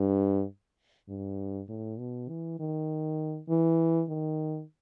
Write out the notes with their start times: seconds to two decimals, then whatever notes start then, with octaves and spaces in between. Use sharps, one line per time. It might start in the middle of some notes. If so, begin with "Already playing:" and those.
Already playing: G2
1.09 G2
1.69 A2
1.99 B2
2.29 E3
2.60 D#3
3.49 E3
4.09 D#3